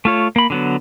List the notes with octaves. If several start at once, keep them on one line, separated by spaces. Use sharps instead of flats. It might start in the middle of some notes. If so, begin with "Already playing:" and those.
A3 F4 C#5
A#3 B5
D3 F#3 B3